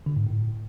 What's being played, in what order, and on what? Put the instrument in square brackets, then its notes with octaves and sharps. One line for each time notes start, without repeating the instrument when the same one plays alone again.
[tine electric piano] D3
G#2
A2